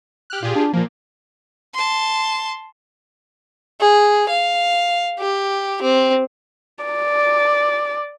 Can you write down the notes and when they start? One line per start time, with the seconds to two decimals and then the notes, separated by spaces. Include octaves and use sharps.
0.30 G4 F6 F#6
0.43 A#2 F4 G4 G#4
0.55 D4
0.73 A#2 F3 A#3
1.74 A5 C6
3.81 G#4
4.29 F5
5.20 G4
5.82 C4
6.85 D5